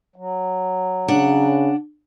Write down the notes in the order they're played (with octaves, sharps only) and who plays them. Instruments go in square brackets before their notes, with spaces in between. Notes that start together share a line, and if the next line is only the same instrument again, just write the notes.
[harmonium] F#3
[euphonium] C#3 [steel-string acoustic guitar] D4 F#5